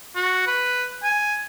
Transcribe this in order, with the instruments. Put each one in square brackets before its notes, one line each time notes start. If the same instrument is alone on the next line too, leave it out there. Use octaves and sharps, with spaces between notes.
[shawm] F#4
B4
G#5